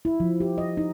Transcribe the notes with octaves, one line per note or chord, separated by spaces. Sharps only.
E4
F3
G4
D#5
D#4